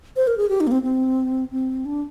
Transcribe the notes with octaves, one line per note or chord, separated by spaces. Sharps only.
C5
A#4
G#4
G4
D#4
A#3
C4
C4
C4
D4